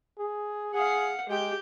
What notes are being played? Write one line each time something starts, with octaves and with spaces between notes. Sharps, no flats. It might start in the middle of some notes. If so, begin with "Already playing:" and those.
G#4
G#4 F5 F#5
G#3 G4 G5